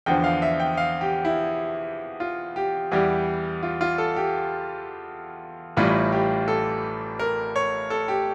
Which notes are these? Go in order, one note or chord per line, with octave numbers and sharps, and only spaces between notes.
E2 D3 F3 G5
F5
E5
G5
F5
G4
E4
F4
G4
E2 E3 G3 G4
F4
F4
A4
G4
A1 A2 E3 G3 F4
G4
A4
A#4
C#5
A4
G4